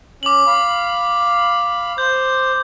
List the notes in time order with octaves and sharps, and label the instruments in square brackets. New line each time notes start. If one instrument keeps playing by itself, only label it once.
[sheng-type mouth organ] C#4 [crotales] D6 F#7
[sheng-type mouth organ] F5 B5
[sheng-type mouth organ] C5 [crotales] G6